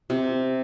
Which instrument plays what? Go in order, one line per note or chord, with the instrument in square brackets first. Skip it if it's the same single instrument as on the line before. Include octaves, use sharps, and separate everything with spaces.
[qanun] C3